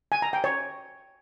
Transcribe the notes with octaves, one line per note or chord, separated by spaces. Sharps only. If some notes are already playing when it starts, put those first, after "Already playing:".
G#5
A#5
G5
C#5